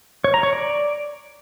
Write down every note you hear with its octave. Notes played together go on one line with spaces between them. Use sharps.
C#5
A#5
C#5
D5